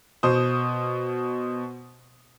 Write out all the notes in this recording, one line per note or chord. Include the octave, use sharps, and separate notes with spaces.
B2 C5 D#6